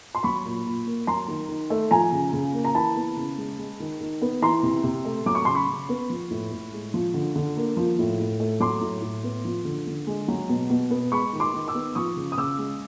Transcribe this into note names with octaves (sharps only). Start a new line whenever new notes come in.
C6
F#3 B5 C#6
A#2
A#2
A#3
F#3 A#5 C6
D#3
D#3
A3
F3 G#5 A#5
C#3
C#3
A#3
A#5
E3 A5 B5
B3
C#3
G#3
G#3
D#3
D#3
B3
E3 A#5 C6
C3
C3
A3
F#3 D6
C#6
C#3 C6
B5 C#6
C#3
B3
F3
A2
A2
G#3
F3
D3
D3
A#3
F3
A2
A2
A3
F#3 C6 D6
A2
A2
B3
F3
D3
D3
G#3
F#3
B2
B2
B3
G#3 B5 C#6
D#3
C6 D6
D#3
D6 E6
B3
F3 C#6 D#6
C#3
D#6
C#3 D6 E6
G#3